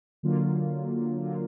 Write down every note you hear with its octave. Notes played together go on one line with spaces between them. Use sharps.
D3 F#3 A#3 F4
D3 F#3 A#3 F4